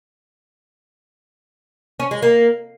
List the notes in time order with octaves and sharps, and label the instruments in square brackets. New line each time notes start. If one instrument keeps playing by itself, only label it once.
[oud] C#4
G#3
A#3